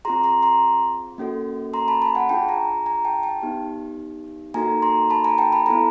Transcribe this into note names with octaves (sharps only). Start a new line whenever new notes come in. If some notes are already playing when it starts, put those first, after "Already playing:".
C4 F4 G#4 A#5 C6
A#5 C6
A#5 C6
A#3 C#4 F#4 A4
A#5 C6
A5 B5
A5 B5
F#5 G#5
D4 F4 G#4 G5 A5
G#5 A#5
G#5 A#5
G5 A5
G5 A5
B3 D#4 G4
A#3 D#4 F#4 A4 G#5 A#5
A#5 C6
A5 B5
G#5 A#5
G5 A5
A5 B5
B3 E4 A4 G#5 A#5